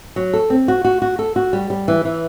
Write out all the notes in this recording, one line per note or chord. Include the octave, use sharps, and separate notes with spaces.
F#3
A4
C4
F#4
F#4
F#4
A4
F#4
G3
G3
E3
E3